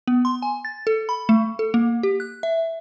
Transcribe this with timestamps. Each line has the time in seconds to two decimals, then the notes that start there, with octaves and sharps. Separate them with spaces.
0.08 B3
0.25 C6
0.42 G#5
0.65 A6
0.87 A4
1.09 B5
1.29 A3
1.59 A4
1.74 A#3
2.03 G4
2.20 F#6
2.43 E5